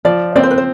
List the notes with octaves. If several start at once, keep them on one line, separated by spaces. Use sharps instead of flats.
F3 D5
C4 D5
C5
B4
C5